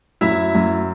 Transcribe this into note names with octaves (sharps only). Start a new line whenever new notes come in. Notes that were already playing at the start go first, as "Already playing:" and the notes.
F#2 E4 E5
F#2